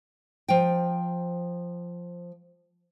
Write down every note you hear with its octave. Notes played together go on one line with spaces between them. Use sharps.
F3 G5